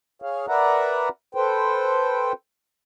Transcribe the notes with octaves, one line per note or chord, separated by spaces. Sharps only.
G#4 C#5 F5
A#4 B4 D5 E5 F#5 A#5
A4 B4 C5 G5